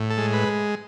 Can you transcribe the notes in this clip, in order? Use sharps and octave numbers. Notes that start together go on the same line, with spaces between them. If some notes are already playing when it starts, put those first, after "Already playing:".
Already playing: A2
A4
G#3
B4